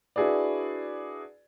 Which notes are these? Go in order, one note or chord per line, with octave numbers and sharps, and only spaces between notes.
D4 E4 F#4 G#4 B4 D5